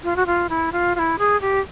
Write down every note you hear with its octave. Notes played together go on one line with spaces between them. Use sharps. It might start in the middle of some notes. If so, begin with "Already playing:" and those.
F4
F#4
F4
E4
F4
F4
E4
G#4
G4